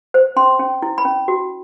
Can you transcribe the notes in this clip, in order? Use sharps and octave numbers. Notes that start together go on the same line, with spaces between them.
C5
C#4 C6
C#4
E4
B5
C#4
F#4